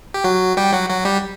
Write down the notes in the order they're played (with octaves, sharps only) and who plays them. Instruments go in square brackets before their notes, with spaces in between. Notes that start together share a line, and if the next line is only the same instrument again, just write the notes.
[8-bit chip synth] G4
F#3 F#4
G3 G4
F#3 F#4
F#3 F#4
G3 G4